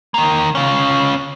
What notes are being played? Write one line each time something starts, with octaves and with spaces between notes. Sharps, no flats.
D#3 A#3
C#4 F4